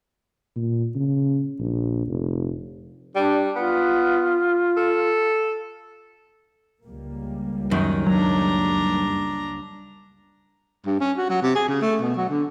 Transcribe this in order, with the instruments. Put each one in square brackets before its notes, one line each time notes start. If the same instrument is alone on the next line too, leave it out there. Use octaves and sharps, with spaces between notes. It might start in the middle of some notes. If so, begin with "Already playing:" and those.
[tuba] A#2
C#3
A#1
F1
[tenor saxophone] G3 [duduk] D4
[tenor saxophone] B3 [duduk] F4
[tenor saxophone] A4
[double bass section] C#2 G3 A#3
[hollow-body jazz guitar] F#2 D#3 [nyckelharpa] D#4
[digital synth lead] F#3 [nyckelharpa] D4 A#5
[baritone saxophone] G2
C#4
F#4
F#3
C3
G#4
C#3
A3
B2
F#3
D3